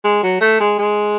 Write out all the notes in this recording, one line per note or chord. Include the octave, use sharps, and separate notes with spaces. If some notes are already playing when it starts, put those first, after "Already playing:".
G#3
F#3
A3
G#3
G#3